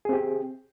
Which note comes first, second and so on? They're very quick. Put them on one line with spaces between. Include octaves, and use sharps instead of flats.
G#4 C4 G4